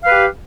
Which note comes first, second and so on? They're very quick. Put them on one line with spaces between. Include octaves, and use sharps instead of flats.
F5 B4 G4